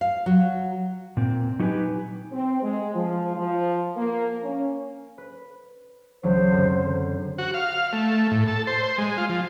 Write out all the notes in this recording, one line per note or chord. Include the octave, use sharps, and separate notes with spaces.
F5
F#3
A#2 C4
F#3 D#4 G4 B4 G#5
C4
G#3
F3
F3
A#3
C#4
B4
C#2 E3 F#3 C5
F#2 D3 C4
F#4
F5
A3
A2
A4
C5
C5
G#3
F4
F3